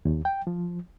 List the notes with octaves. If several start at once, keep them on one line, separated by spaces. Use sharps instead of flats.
D#2
G5
F3